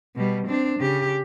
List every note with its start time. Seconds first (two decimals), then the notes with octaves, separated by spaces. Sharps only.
0.16 B2 G3
0.47 C4 D4
0.80 C#3 G4